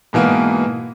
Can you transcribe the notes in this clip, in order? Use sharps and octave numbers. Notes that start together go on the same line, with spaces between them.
G#2 B2 E3 A#3 B3